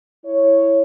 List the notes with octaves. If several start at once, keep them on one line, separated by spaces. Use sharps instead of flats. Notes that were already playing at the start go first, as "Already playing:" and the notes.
E4 C#5